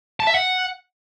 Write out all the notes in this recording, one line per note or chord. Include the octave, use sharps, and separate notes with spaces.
A5
E5
F#5